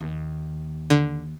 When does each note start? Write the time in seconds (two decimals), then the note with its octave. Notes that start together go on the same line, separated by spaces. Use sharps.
0.01 D#2
0.90 D3